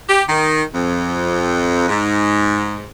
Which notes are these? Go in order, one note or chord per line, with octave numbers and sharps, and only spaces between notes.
G4
D#3
F2
G#2